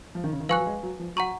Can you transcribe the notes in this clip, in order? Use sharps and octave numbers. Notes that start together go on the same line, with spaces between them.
F3
D#3
C#3
D#3
F3 B4 F5 G#5 C#6 F#6
F#3
G#3
F#3
F3
F#3 F#5 A#5 C#6